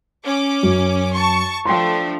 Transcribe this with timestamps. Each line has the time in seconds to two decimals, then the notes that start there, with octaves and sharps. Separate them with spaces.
0.24 C#4 D6
0.63 F#2
1.13 A5 C#6
1.65 F3 A3 D4 G5 C6